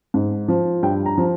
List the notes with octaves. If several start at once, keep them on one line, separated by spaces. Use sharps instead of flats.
G#2
F3
G2 G5
A#5
F3